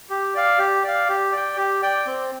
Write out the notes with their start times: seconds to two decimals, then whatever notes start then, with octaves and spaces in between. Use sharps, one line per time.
0.10 G4
0.35 D5 F5
0.58 G4
0.84 D5 F5
1.09 G4
1.32 D5 G5
1.57 G4
1.82 D5 G5
2.06 C4